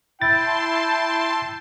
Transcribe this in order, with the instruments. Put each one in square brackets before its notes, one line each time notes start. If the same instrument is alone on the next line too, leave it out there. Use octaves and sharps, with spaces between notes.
[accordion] E4 [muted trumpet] G5 [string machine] A5 C6 [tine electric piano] A6